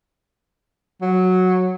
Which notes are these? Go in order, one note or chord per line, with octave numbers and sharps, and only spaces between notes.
F#3